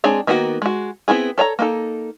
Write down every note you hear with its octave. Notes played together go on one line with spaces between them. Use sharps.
G#3 C4 D4 G#4 C#5
D#3 A#3 B3 D#4 F#4
G#3 F#4
B3 C4 E4 G#4
A4 C#5 A5 A#5
A#3 D#4 A4